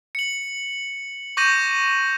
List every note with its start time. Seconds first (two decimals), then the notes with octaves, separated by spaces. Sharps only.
0.15 C#7 F#7
1.37 C#6 D6 G6 A#6 D#7 F#7